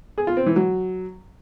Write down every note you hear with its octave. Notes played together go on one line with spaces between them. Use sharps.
G#4
F4
C4
E3
F#3